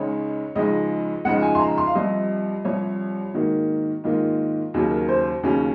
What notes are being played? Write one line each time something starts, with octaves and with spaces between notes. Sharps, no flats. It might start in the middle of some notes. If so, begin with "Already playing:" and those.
Already playing: C#2 C#3 G#3 D#4 C#5
C#2 C#3 F3 G#3 D#4 D#5
C#2 C#3 F3 G#3 D#4 F#5
G#5
C6
A#5
C6
F5
C2 C3 F3 D#5
C2 C3 F3 C#5
G#2 D#3 A#3 F#4
G#2 D#3 A#3 F4
D#2 C#3 F#3 C#4
A#4
C5
D#2 C#3 F#3 C#4